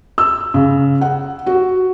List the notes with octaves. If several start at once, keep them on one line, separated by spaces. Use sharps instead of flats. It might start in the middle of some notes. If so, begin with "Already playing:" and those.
E6
C#3
F#5
F#4